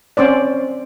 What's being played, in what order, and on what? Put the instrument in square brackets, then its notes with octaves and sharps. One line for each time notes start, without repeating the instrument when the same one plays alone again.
[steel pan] C4 C#4 C5 D5